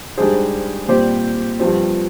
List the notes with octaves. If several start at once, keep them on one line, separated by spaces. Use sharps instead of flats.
G#2 G3 D4 G#4 C5
A#2 G3 C4 G4 C5
G2 F3 C4